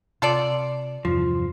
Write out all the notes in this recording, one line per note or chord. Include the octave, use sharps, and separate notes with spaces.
C3 F4 A4 D5
E2 G2 C3 F3